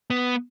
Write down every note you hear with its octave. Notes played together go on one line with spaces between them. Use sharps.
B3